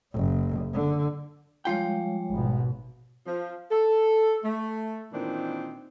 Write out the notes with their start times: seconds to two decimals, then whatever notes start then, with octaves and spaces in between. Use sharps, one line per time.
0.14 F#1
0.74 D3
1.65 F3 G3 G#3 F4 C#5 G5
2.31 G#1 B2
3.26 F3
3.71 A4
4.44 A3
5.13 A#2 D#3 E3 C4 D4 D#4